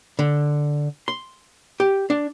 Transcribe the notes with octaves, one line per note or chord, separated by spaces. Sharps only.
D3
C6
G4
D4